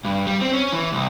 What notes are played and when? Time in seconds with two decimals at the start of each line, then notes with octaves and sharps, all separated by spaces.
0.05 G2
0.27 G3
0.41 C4
0.53 C#4
0.73 E3
0.92 C2